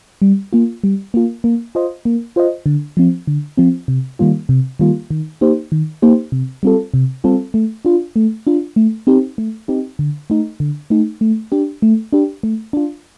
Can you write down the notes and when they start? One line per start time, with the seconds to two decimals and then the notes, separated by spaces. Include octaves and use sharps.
0.22 G3
0.53 A#3 F4
0.84 G3
1.14 A#3 F4
1.44 A#3
1.75 F4 C5 D#5
2.05 A#3
2.36 F4 C5 D#5
2.66 D3
2.97 F3 C4
3.27 D3
3.57 F3 C4
3.88 C3
4.19 D#3 G3 A#3 F4
4.49 C3
4.79 D#3 G3 A#3 F4
5.10 D#3
5.41 A#3 D#4 G4 C5
5.72 D#3
6.02 A#3 D#4 G4 C5
6.32 C3
6.63 G3 C4 F4 A4
6.94 C3
7.24 G3 C4 F4 A4
7.54 A3
7.85 D4 F4
8.16 A3
8.47 D4 F4
8.76 A3
9.07 C4 D#4 G4
9.38 A3
9.68 C4 D#4 G4
9.99 D3
10.30 A3 D#4
10.60 D3
10.90 A3 D#4
11.21 A3
11.52 D4 G4
11.82 A3
12.13 D4 G4
12.43 A3
12.73 D4 F4